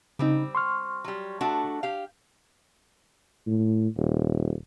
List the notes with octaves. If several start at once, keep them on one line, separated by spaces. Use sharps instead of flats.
C#3 G3 C4 D#4
C6 C#6 F6
F#3 G3
A3 D4 F#4
G4 F5
A2
D#1